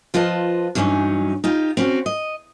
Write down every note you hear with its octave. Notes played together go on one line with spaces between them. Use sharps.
F3 F4 B4 D#5 A5
G2 E3 F#3 A#3 C#4 D#4
D#4 F4 G4
C4 C#4 F#4
D#5